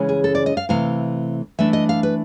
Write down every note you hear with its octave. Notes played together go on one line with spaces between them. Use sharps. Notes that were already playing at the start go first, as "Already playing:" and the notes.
Already playing: C#3 E3 G#3 C#4
G#4
A4
D5
D#5
F5
C3 E3 A3 F5
E3 A3 D4 E5
D#5
F5
B4